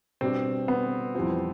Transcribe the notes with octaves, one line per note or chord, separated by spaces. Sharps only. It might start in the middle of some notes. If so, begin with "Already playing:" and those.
B2 G3 C4 D4 G4
B3
F2 E3 G3 C4 F4